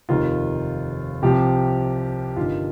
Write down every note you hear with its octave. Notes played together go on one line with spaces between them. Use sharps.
F1 D#2 D#3 F4
C2 C3 F3 G4
G1 G2 D#3 F4